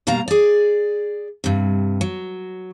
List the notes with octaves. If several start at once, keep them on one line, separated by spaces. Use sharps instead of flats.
B2 G3 A#3 F5 A#5
G#4 D5
G2 C3
F#3